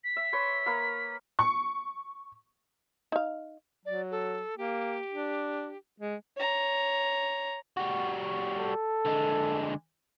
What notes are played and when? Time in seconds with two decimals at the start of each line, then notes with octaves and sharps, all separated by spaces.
0.04 B6
0.17 E5
0.33 B4 C#5 C6
0.66 A#3 B4 F5
1.39 C#6
3.12 D#4 F5
3.86 F#3 D5
4.11 A4
4.58 A#3 G4
5.13 D4
6.00 G#3
6.37 C#5 A#5
7.77 G3 F#4
8.57 A4
9.06 D3 G#3